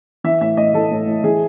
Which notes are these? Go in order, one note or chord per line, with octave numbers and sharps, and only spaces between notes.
E3 E5
A2 E5
A2 D#5
E3 A4
A2
A2
E3 G#4